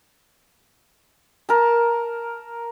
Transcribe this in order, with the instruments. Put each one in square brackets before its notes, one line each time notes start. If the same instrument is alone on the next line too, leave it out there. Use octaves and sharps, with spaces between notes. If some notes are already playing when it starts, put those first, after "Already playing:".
[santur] A#4 A5